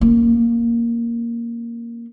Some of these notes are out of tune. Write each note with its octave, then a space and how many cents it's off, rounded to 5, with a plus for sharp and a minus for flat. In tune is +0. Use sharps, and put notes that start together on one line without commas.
A#3 +0 C#4 -20